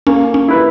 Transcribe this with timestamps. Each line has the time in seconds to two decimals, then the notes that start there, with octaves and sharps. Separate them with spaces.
0.07 A#3 C#4
0.34 C#4
0.48 E4 B4